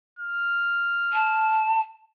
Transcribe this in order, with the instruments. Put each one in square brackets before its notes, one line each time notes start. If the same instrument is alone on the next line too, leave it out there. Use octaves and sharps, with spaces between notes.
[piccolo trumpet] F6
[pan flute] A5